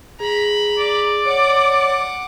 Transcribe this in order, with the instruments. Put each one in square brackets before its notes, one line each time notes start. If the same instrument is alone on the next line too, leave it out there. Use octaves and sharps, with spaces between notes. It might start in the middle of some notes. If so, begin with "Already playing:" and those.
[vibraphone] G#4 [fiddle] A#5 B5
[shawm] D5
[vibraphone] C#5 [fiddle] F#5 D6